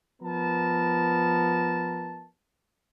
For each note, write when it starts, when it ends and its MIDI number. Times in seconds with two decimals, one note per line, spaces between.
0.22 2.27 53
0.22 2.27 59
0.22 2.27 70
0.22 2.27 81